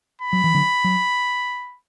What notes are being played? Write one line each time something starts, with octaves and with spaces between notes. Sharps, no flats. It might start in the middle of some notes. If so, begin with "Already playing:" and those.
B5
F#3
E3
D3 F#3
F#3